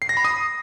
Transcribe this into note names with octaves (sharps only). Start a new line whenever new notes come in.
C7
A#6
B5
D#6